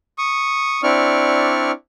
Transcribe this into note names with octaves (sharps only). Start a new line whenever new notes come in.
C#6 D#6
C4 D4 E4 D5 C#6 F6